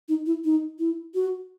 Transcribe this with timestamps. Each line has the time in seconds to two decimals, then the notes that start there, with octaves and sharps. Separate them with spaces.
0.08 D#4
0.26 E4
0.44 D#4
0.79 E4
1.14 F#4